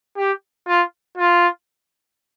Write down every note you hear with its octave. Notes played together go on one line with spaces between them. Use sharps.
G4
F4
F4